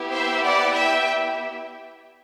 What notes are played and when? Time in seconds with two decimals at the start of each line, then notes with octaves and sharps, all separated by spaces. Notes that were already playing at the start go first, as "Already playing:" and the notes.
Already playing: B3 E4 G4
0.12 C5 E5
0.44 D5 F#5
0.75 E5 G5